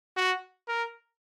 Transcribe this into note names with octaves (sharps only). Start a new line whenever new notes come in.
F#4
A#4